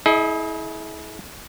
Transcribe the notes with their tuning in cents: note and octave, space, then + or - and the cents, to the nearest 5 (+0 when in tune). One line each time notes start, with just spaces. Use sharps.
E4 -30 G#4 +40 D#5 +0